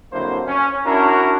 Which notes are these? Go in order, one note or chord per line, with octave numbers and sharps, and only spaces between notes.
F2 D3 F#3 A#3 E4 C5
C#4
C#4 D4 E4 F#4 A#4